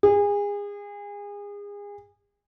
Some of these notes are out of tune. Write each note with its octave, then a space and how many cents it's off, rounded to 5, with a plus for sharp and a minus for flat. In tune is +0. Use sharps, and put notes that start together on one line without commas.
G#4 -30